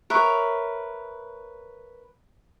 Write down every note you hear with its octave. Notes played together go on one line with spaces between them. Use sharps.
A#4 B4 C#5 E5